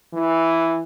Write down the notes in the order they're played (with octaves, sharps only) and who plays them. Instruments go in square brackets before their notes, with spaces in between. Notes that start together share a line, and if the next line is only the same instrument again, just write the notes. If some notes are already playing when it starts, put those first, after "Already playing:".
[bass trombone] E3